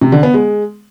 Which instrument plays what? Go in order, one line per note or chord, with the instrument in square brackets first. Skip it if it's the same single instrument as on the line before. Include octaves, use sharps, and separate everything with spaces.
[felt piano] C3
D3
B3
G#3